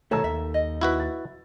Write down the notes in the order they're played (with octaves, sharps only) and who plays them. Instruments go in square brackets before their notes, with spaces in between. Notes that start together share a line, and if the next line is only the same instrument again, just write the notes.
[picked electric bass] B2 D#3 A3 [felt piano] A4 A#5 E6 [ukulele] C#5 A5
[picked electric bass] D#2 [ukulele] E5
[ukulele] D#5
[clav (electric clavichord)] E4 F#4 B4
[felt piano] A6